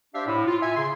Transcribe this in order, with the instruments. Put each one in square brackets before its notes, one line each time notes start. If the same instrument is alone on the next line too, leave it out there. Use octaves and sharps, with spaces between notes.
[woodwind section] D4 G4 C5 D5 E5 F5
A2
F4
E5 G#5
C#3 C6